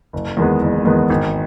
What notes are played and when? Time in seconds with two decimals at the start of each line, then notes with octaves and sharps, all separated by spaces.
0.13 F#1
0.37 E2 D#3 G#3 B3
0.61 F#1
0.85 E2 D#3 G#3 B3
1.10 G#1